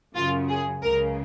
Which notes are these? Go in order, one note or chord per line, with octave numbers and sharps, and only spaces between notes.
F#2 C#3 F4
G#4
C#2 C#3 A#4